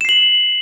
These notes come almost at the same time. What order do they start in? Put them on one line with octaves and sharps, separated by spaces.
E7 C7 F#7